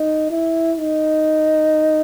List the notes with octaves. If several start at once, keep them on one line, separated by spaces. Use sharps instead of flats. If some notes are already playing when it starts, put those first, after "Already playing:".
Already playing: D#4
E4
D#4